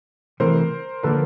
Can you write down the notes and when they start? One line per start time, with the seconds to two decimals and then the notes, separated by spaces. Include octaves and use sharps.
0.40 C3 E3 A3 A#4 C5
1.03 D3 F3 A#3 D4 A4 B4